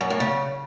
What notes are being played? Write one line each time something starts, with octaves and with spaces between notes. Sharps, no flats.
F#2
A2
C#3